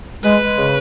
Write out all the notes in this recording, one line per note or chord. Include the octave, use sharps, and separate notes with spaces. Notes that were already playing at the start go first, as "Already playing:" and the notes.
G#3 B4
G#3
C#3